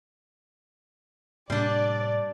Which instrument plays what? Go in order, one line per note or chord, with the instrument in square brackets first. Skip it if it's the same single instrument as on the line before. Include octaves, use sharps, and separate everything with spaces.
[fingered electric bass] A2 C3 A#3 [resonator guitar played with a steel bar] G3 D4 [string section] D5